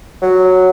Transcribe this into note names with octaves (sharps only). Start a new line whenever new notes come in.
F#3